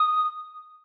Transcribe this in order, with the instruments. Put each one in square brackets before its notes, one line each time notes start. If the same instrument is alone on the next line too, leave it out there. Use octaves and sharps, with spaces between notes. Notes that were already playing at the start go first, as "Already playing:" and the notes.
Already playing: [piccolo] D#6